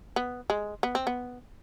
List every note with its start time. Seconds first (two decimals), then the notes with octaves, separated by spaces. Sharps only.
0.16 B3
0.50 G#3
0.83 B3
0.95 C4
1.07 B3